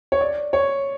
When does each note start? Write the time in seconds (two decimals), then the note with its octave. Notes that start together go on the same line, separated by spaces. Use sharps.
0.12 C#5
0.21 D5
0.53 C#5